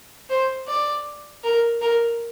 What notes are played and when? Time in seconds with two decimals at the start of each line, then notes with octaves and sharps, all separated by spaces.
0.30 C5
0.68 D5
1.44 A#4
1.81 A#4